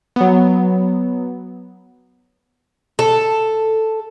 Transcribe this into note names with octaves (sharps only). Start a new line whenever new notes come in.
F#3 B3
A4